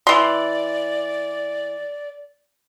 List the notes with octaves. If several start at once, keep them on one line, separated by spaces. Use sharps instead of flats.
E3 D5 C6